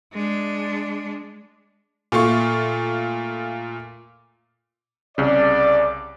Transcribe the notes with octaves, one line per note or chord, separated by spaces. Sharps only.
G#3 D4
A#2 A3 F4 C#6
C2 C#3 D5